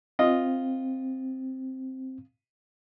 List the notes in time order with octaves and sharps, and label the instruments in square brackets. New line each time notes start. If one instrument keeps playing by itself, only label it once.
[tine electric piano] C4 [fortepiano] F4 D#5